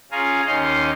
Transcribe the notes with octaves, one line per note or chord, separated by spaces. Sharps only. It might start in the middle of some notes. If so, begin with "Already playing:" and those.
C#4 F4 G#4 F5 G#5 A#5
D#2 C#4 D#4 D#5 F5 C6